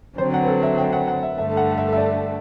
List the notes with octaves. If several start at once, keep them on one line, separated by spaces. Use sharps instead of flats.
D3 F#3 C4 C5
F#5
B4
A4
E5
G5
F#5
F#5
E5
G2 D3 A3 E5
F#5
F#5
E5
E5
D5